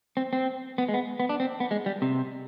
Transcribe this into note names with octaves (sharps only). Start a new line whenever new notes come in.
C4
C4
B3
G#3
B3
B3
D4
C4
B3
G#3
G3
C3